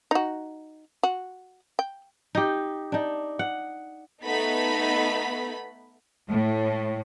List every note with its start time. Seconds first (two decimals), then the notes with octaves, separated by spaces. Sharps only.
0.11 D#4 F#4
1.03 F#4
1.79 G5
2.35 D#4 G4
2.92 D4 D#4
3.39 F#5
4.23 A3 B3 D#4 B5
6.30 A2